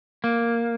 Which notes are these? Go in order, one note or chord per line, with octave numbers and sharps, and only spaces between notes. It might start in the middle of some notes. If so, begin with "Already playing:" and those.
A#3